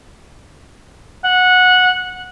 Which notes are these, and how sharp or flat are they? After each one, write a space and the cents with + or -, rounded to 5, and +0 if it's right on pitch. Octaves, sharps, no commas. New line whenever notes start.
F#5 -15